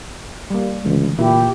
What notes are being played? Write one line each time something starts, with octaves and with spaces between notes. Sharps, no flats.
G3 A#3
C#2 D3 E3 A3
A#2 E4 G4